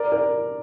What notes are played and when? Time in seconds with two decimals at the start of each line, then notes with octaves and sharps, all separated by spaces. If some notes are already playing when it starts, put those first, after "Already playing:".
Already playing: A#4 D5
0.12 A#4 D5